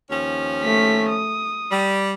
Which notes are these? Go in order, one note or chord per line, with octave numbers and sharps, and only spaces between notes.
D#2 F3 C#4
A3 B6
D#6
G3